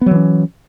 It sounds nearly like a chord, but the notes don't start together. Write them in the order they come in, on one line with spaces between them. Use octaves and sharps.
B3 F#3 E3 C#4